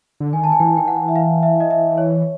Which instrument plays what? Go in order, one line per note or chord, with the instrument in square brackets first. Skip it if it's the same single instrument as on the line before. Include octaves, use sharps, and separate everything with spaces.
[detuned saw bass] D3
[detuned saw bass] D#3 [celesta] G#5
[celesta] A5
G#5
[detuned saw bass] E3 [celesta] G5
[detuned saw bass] D#3 [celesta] G5
[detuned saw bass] E3 [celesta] F#5
[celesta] E5
F5
E5
D#5
E5
C#5